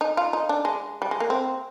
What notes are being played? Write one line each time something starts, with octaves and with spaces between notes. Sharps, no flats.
D#4
F4
D#4
D4
G#3
G3
G#3
A#3
C4